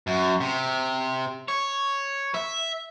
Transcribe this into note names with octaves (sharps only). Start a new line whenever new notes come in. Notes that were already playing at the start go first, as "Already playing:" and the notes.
F#2
C3
C#5
E5